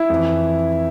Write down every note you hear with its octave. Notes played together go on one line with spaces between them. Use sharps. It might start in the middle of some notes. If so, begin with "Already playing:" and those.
Already playing: E4
F2 E3